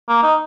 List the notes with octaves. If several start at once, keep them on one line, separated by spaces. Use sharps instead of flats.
A#3
D#4